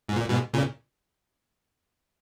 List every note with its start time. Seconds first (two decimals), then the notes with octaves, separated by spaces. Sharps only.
0.09 G#2
0.16 A#2
0.29 G#2 B2
0.53 A#2 C#3